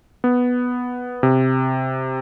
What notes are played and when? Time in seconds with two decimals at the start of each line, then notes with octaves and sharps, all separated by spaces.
0.24 B3
1.23 C3